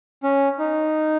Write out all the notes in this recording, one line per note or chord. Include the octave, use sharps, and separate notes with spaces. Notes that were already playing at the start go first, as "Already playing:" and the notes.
C#4
D#4